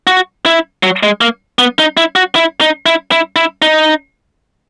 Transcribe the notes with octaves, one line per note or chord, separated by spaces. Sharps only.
F#4
E4
F#3
G#3
A#3
B3
D#4
E4
F#4
E4
D#4
E4
E4
E4
D#4